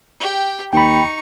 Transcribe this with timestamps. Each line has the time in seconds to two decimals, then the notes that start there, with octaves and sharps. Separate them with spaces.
0.20 G4 G5
0.73 D#2 D#4 G5 B5 C#6